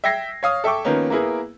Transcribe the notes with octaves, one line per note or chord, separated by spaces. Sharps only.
E5 G5 G#6 A#6 C7
C#5 F5 D#6
A4 E5 G5 C#6 D6
D#3 F3 A#3 B3 C#4
A#3 B3 E4 G#4 A#4